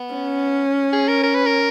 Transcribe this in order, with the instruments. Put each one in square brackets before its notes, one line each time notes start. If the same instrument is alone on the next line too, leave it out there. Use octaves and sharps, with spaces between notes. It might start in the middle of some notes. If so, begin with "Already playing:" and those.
Already playing: [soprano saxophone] B3
[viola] C#4
[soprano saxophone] G#4
A#4
A#4
B4
A#4